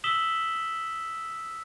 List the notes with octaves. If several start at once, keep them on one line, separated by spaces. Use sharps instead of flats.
D#6 E6 B6 E7 F#7 G7